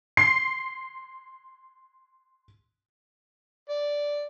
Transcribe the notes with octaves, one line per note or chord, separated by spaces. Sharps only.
C6 C7
D5